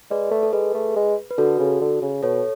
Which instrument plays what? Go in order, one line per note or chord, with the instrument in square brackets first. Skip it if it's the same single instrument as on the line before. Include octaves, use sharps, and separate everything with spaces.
[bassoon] G#3 [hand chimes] B4 D5
[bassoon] A3
[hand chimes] A4
[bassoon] G#3 [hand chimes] G#4 B4
[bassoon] A3
G#3
[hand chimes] B4
[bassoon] D3 [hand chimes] F#4 A4
[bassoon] C#3
D3
C#3
[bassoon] B2 [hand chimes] A4 C#5